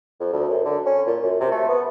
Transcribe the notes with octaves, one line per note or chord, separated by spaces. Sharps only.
F2
D2
F#2
D3
C#4
A#2
F#2
C3
A3
B3